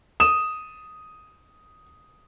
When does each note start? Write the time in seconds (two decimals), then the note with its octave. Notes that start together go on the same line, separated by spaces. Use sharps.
0.20 D#6 E7